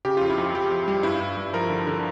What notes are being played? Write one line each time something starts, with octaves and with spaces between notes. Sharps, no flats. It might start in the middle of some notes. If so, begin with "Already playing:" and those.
C#3 G4
F4
F2
E4
F2 F4
F2 G4
F2
G3
G2 E4
G2
G2
F3 A#4
D3
D3